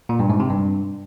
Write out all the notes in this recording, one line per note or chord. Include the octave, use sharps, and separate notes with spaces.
A#2
G2
G#2
C3
G2